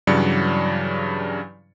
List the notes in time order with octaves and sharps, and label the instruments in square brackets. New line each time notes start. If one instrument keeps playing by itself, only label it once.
[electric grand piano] G2 C#3 E3 F#3 D5 C#7